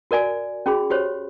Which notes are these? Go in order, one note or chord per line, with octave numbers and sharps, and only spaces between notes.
F#4 A#4 D5 G#5
C#4 F#4 G#4 B5
F#4 G4 C5 C#5